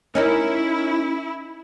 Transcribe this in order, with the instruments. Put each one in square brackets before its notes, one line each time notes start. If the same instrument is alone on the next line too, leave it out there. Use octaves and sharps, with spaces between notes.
[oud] C#4 D#4 A#4 [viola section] E4